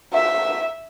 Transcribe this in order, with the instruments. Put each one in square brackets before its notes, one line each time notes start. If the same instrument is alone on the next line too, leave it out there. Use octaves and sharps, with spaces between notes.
[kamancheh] E5